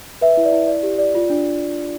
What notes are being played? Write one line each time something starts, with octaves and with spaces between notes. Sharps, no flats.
B4 E5
E4
D5
E4
D5
G4
D5
F4
D4